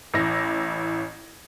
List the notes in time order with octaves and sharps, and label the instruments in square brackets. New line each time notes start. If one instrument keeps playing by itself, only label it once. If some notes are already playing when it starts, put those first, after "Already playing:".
[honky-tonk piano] A1 E4 A#6